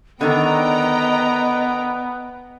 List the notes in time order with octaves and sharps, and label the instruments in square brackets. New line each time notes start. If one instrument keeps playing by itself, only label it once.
[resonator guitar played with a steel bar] D3 D#3 [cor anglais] B3 [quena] D#5 [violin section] G5 A#5